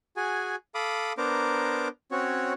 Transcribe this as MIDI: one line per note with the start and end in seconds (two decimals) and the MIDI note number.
0.17 0.55 66
0.17 0.55 68
0.17 0.55 80
0.75 1.13 69
0.75 1.13 77
0.75 1.13 83
0.75 1.13 86
0.75 1.13 87
1.18 1.88 59
1.18 1.88 62
1.18 1.88 70
1.18 1.88 72
1.18 1.88 82
1.18 1.88 86
2.11 2.53 60
2.11 2.53 61
2.11 2.53 66
2.11 2.53 73